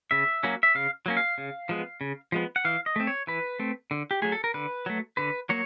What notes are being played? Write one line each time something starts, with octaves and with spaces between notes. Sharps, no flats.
C#3 E5
F#3 A#3 C#4
E5
C#3 F5
F#3 A#3 C#4
F5
C#3
F3 G#3 B3
C#3
F3 G#3 B3
F#5
E3 F5
D#5
A3 C4
C#5
E3 B4
A3 C4
D3
G4
F#3 A3 G#4
A4
A#4
D3 B4
F#3 A3
D3 B4
F#3 A#3 C#5